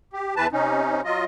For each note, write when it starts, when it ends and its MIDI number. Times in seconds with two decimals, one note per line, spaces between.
0.13 0.34 67
0.36 0.47 40
0.36 0.47 52
0.36 0.47 71
0.36 0.47 81
0.52 1.01 48
0.52 1.01 61
0.52 1.01 63
1.04 1.25 54
1.04 1.25 65
1.04 1.25 75